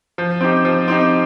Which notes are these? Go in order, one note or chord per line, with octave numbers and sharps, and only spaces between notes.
F3
C4 D#4 G4
F3
C4 D#4 G4